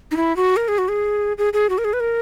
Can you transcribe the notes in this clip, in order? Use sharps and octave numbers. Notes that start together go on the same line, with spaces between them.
D#4
E4
F#4
A#4
G#4
F#4
G#4
G#4
G#4
F#4
A#4
G#4
B4
A#4